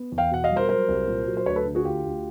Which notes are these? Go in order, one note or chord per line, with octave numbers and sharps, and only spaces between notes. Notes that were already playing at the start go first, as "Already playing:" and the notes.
Already playing: B3
E2
F5 G5
B2 F#5
D#5 F5
G3
A#4 C5
F#3 A#4 C5
C2
A#2
F#3
C5
D2 B4 C#5
A4 B4
D3
F#4 G#4
D2 F4 G4
D2